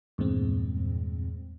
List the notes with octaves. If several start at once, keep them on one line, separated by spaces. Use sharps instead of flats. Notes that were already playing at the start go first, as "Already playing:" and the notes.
E2 G2 A#2 G#3 C4